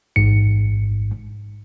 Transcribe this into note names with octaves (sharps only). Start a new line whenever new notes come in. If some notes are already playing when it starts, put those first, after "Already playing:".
A1 G#2 C#7